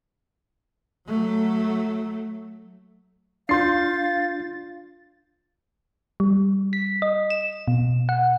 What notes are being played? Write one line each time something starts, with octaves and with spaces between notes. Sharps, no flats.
F#3 A3
D4 F4 F5 C6 G6 A6 C7
G3
B6
D#5
E7
B2
F#5